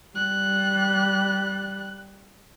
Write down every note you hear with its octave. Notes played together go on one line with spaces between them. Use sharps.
G3 F#6